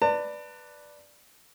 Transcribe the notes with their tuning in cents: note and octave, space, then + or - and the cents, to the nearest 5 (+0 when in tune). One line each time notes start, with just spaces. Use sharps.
B4 +0 D5 +0 A5 +40